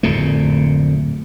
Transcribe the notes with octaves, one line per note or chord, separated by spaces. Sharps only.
D1 F2 A#2 A3